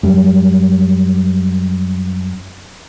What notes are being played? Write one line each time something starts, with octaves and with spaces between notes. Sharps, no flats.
F#2 G3